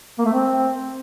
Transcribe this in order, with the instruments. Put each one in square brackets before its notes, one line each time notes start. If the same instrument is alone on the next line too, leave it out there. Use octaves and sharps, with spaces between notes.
[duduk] A#3
A3
C4